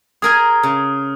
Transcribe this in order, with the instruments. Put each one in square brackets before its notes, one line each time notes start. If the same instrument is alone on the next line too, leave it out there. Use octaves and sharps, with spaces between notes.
[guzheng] G#4 A#4 G#5 [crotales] D#6 F6
[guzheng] C#3